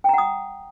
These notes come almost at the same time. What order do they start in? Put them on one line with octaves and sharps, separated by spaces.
G5 A#5 F#5 D#6